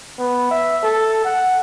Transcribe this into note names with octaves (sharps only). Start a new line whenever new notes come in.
B3
E5
A4
F#5